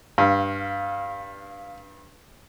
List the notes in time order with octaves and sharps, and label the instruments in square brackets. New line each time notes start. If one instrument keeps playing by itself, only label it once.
[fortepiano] G2 [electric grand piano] F5